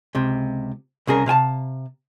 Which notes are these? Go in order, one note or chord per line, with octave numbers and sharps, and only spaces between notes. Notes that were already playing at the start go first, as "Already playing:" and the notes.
C#2 C3
C2 C#3 G#4 A#4
C3 F5 G#5 A5